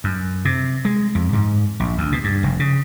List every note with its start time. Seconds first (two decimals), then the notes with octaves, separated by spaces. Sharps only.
0.04 F#2
0.45 C3
0.85 G#3
1.15 F2
1.33 G#2
1.80 A#1
1.98 D2
2.12 B2
2.24 G2
2.43 F1
2.59 C#3